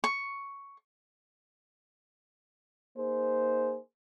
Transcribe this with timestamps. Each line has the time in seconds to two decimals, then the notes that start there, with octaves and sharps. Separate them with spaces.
0.04 C#6
2.97 A#3 D#4 G#4 C5